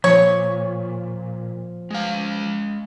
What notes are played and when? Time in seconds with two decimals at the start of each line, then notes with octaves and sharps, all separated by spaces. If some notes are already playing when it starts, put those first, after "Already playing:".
0.04 A#2 F3 C#5
1.91 G#3 F5